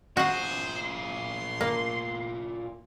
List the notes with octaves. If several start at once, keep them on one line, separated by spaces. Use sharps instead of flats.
A#2 F#4 G#4 C5 F#5
C6
A#3